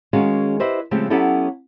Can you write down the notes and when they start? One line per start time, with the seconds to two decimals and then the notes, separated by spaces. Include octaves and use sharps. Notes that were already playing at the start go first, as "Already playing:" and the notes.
0.13 D#3 G#3 C#4 F#4 G#4 F5
0.60 E4 G4 B4 C5 D#5 E5
0.91 C#3 F3 G#3 A3 C4 G4
1.10 F#3 B3 C#4 E4 G4 A4